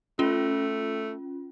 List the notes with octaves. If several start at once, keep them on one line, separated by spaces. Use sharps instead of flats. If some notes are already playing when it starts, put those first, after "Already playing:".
A3 C#4 F4